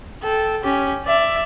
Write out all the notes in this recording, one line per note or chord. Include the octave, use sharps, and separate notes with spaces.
A4 G5
C#4 G4
D5 E5